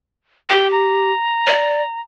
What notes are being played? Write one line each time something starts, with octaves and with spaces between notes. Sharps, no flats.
G4 G5
A#5
D5